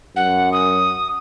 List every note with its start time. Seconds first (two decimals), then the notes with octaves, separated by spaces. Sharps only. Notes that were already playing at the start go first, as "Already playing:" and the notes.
0.16 F#2 F#5
0.52 D#6